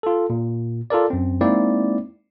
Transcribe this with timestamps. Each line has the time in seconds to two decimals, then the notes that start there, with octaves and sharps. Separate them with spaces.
0.03 F4 A4
0.30 A#2
0.90 F4 A4 A#4 D5
1.10 F#2 C4
1.41 G#3 A#3 C4 D#4 E4 D5